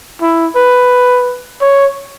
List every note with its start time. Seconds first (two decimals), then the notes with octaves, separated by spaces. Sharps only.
0.21 E4
0.56 B4
1.61 C#5